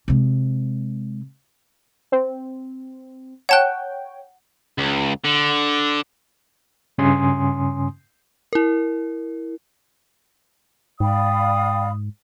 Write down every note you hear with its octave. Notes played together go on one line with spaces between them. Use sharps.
C3 G#3
C4
C#5 F#5 G5 A5 F#6
C#2
D3
G2 C#3 C#4 G#5 C6 D#6
E4 A#4
G#2 D5 F5 G5 B5 D#6